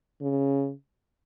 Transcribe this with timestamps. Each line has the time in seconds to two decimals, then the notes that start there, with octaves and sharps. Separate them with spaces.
0.22 C#3